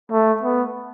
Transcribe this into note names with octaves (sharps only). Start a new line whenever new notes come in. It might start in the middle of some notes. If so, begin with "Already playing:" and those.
A3
B3